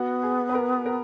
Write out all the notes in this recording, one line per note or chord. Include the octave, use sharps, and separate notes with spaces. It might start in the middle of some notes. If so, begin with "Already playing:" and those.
Already playing: B3 F#4
G#4
B4
A#4
A#4